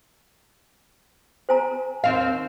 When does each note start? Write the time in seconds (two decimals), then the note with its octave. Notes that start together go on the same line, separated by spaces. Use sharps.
1.49 C5 G#5 A#5
2.04 D#2 C4 F5